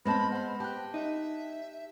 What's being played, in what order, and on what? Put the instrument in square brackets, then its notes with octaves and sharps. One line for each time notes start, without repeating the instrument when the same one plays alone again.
[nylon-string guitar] G#3 C4 A5 [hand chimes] B3 B4 A#6 [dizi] B5
[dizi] C5 [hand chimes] F#5 B5
[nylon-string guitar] G4 [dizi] G5 [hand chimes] A5 F#6
[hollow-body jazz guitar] D#4 [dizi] E5